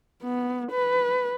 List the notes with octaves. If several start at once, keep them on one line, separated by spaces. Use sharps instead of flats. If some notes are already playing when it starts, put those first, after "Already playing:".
B3
B4